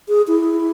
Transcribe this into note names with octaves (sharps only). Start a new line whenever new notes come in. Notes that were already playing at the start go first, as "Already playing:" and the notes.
G#4
E4